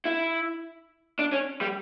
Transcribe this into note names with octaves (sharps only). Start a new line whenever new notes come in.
E4
D4
C#4
G3